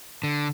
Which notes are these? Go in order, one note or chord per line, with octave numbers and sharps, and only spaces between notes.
D3